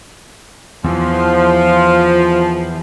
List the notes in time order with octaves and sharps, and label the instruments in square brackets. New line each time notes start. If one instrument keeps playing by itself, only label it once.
[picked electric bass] E2 [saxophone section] F3